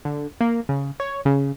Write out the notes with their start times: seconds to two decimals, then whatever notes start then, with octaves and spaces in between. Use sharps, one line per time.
0.05 D3
0.41 A#3
0.69 C#3
1.00 C#5
1.25 C#3